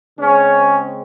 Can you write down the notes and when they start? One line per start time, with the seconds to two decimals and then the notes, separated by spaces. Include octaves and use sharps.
0.18 C#3 G#3 C4 C#4